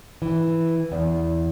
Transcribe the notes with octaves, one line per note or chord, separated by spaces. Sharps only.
E3
E2